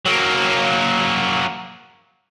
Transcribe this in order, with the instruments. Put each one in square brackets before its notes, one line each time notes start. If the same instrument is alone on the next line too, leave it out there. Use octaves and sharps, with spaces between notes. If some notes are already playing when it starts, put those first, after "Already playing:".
[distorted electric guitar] F#3 A#3